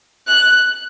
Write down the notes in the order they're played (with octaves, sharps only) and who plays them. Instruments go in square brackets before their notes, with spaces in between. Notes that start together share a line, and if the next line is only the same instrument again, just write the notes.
[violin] F#6